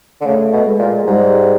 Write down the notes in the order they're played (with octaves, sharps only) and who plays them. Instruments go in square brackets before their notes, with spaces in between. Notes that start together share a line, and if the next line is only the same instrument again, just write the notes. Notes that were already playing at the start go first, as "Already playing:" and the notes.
[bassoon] D3
[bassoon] C#3 [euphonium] A3
[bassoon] B2
[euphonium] G#3
[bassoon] A#2
[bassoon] G#2 [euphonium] G3